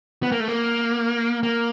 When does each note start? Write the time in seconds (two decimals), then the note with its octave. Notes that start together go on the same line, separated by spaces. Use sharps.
0.23 B3
0.32 A#3
0.40 A3
0.48 A#3
1.43 A#3